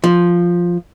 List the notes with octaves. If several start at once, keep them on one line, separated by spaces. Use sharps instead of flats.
F3